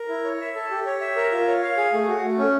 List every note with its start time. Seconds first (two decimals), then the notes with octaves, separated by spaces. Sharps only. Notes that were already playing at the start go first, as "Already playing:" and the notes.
Already playing: A#4
0.09 E4
0.24 C#5
0.41 E5
0.55 A4
0.71 G4
0.86 C#5
1.01 E5
1.16 A#4
1.32 F4
1.48 C#5
1.62 F5
1.77 G#4
1.93 A3
2.08 F#4
2.24 A3
2.38 C#4